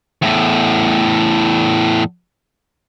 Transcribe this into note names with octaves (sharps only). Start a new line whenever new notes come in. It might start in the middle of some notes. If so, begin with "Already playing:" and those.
E2 A2